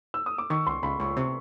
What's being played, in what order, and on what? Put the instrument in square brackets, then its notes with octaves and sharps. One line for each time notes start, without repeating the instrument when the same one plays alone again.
[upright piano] E6
D#6
D6
[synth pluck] D#3 [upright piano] C#6
[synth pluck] C#2 [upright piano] C6
[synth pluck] C#2 [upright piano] B5
[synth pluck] C#2 [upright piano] C#6
[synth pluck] C3 [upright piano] C#6